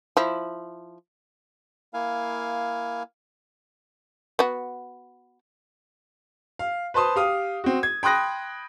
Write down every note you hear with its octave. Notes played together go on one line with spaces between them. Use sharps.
F3 E4
A#3 E4 F5 G#5
B3 F#4
F5
B4 C5 A5 C6 D#6
G4 F5 D#6
C4 F#4
G#6
G5 B5 C6 D#6 F#6 A#6